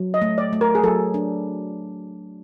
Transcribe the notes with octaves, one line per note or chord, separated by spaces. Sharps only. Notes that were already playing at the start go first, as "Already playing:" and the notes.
Already playing: F#3
D#5
A3
D5
A3
A#4
G#4
F#3 A4
D4